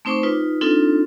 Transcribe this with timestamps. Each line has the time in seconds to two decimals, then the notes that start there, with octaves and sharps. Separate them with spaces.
0.05 A3 C4 D#4 C5 C#6 D6
0.23 D#4 F4 B4
0.61 C4 D4 D#4 F4 A4